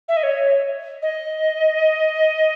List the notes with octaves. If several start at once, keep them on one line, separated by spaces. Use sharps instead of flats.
E5
D#5
C#5
D#5